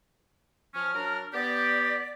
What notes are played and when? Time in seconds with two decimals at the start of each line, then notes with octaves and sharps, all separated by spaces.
0.74 F3 C#4 F6
0.94 F#3 D4 A#4
1.33 B3 G4 D5